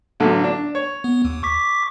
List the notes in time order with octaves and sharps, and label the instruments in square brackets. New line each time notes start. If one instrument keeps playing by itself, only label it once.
[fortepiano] A1 D3 F#3
D4
C#5
[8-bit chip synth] B3
D#2
C#6 D6 B6